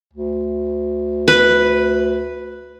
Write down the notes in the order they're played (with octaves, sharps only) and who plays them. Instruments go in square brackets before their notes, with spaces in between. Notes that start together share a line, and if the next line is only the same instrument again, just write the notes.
[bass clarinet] D2
[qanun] B4